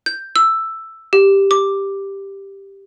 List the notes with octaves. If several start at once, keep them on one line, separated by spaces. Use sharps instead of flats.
G6
E6
G4
D6